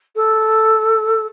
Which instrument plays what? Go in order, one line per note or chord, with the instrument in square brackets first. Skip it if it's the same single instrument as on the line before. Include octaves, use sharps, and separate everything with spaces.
[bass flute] A4